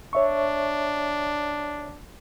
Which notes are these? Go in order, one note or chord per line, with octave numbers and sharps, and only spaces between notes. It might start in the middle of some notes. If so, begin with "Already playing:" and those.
D4 C#5 E5 C#6